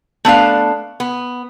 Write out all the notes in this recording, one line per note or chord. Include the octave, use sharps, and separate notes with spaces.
A3 B3 D4 F5
B3